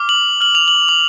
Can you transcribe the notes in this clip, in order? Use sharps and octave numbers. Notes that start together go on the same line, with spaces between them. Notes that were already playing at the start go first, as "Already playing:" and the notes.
Already playing: D6 F6
F#7
F6 F#7
F7
F#7
D6 F#7